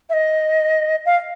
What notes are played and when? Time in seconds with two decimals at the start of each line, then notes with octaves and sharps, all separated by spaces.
0.10 E5
0.13 D#5
1.06 F5